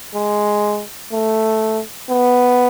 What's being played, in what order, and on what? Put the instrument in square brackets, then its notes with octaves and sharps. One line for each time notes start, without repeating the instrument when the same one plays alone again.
[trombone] G#3
A3
B3